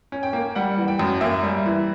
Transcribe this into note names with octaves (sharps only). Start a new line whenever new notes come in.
C#4
G5
A#3
G3 F#5
E3
G5
F#2
A#3 E5
G3
E3